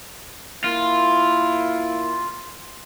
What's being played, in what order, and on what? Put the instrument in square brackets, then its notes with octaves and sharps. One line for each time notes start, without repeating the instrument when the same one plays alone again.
[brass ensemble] A#3 E4 [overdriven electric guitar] F4